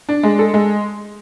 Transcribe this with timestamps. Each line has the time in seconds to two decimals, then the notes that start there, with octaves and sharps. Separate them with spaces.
0.09 D4
0.23 G#3
0.39 A4
0.54 G#3